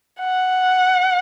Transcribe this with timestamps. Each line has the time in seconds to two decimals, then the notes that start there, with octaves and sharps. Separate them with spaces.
0.20 F#5